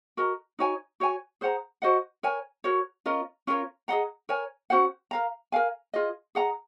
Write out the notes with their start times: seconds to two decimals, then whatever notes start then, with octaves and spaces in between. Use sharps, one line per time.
0.17 F#4 A#4 D#5 A#5
0.59 D#4 F#4 C#5 G#5
1.00 F#4 C#5 G#5
1.41 G#4 C5 F#5 A#5
1.82 F#4 C5 D#5 F#5
2.23 A#4 C#5 G#5
2.64 F#4 A#4 C#5
3.06 C#4 F4 A#4 D#5
3.47 C#4 F4 A#4 C#5
3.88 G#4 D#5 F#5 A#5
4.29 A#4 C#5 G#5
4.70 C#4 F#4 C5 F#5
5.11 A#4 F5 A#5
5.52 A#4 F5 G#5
5.94 F4 G#4 D#5
6.35 G#4 D#5 F#5 A#5